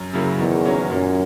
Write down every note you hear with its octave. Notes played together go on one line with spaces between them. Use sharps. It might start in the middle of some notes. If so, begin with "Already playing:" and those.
Already playing: F#2
C#3 F#3 A#3 E4
E2 D#3
F#3 A#3 C#4
F#2 A#2